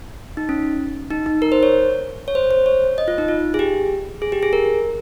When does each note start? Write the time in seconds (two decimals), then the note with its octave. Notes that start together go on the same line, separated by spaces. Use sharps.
0.37 D#4
0.49 C#4
1.11 D#4
1.26 D#4
1.42 A#4
1.52 C5
1.63 C#5
2.28 C#5
2.35 C5
2.51 C5
2.66 C#5
2.98 D#5
3.08 F4
3.18 D#4
3.28 F4
3.54 G#4
3.59 G4
4.22 G#4
4.32 G4
4.43 G#4
4.53 A#4